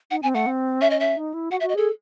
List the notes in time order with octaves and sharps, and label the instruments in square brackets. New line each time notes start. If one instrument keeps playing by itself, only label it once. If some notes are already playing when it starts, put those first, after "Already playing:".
[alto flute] D#4 [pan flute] F#5
[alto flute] C4 [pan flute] G#5
[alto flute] A3 [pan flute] F#5
[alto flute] C4
[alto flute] C#4 [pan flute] E5
[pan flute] D#5
E5
[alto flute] D#4
E4
[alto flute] F#4 [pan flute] F#5
[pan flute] E5
[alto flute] F#4
[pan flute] D#5
[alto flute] G#4 [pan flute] A4